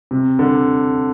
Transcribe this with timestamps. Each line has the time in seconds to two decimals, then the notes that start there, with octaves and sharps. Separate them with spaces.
0.11 C3
0.39 D3